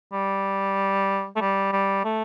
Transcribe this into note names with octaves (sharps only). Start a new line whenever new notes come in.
G3
A3
G3
G3
A3